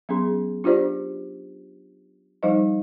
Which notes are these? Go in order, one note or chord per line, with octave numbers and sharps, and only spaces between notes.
F#3 B3 C#4 G#4 C6
D4 F4 G4 C5 D5
F3 G3 D#4 C5 D#5